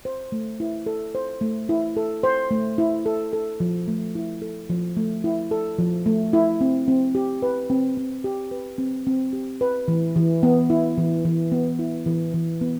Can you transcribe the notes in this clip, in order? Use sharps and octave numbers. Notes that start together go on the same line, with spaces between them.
C5
A3
E4
A4
C5
A3
E4
A4
C5
A3
E4
A4
A4
F3
A3
E4
A4
F3
A3
E4
A4
F3
A3
E4
C4
C4
G4
B4
C4
C4
G4
B4
C4
C4
G4
B4
E3
E3
B3
E4
E3
E3
B3
E4
E3
E3
B3